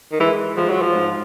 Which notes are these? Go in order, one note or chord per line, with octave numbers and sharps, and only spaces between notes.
D#3
E3 G#3
F3 G#3
F#3
F3
G#2